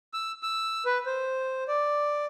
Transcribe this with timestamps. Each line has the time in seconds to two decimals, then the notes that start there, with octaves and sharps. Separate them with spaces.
0.14 E6
0.43 E6
0.86 B4
1.06 C5
1.68 D5